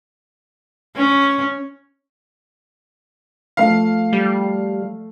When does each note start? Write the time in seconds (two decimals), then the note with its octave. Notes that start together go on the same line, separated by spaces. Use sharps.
0.96 C#4
3.57 F3 A3 F5
4.13 G3